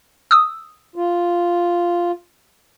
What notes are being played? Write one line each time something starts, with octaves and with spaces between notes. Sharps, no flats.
D#6 E6
F4